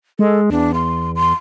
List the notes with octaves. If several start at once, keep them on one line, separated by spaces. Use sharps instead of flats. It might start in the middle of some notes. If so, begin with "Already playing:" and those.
G#3 A4
E2 D4
C6
C6